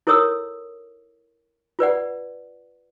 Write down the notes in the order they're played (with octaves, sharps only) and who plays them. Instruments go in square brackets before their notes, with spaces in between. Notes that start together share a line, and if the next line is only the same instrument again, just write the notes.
[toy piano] E4 A4 A#4 C#5 D#6 E6
F4 B4 D5 F#5